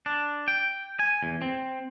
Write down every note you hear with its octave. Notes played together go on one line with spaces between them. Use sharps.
D4
G5
G#5
E2
C4